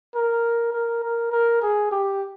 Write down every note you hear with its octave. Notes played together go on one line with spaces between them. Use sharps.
A#4
A#4
A#4
A#4
G#4
G4